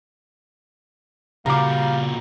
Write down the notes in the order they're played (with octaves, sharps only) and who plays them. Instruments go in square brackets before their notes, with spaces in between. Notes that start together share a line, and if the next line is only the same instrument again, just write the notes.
[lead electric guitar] A#2 F#4 [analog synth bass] C#3 [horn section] G3 A#4 F5 [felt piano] A#5 D6